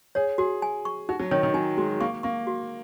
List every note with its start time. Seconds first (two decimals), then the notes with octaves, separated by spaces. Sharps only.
0.15 G#4 C#5
0.38 F#4 G#4
0.62 G#5
0.85 C#6
1.09 D#4 F#4
1.20 F#3
1.31 D#3 C#5
1.43 D#3
1.54 F#3 G#5
1.77 G#3 F#4
2.00 A#3 C#6
2.23 A#3 C#6
2.47 F#4